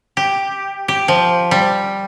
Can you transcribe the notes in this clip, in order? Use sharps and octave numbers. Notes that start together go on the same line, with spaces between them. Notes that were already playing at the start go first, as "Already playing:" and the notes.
G4
G4
F3
G3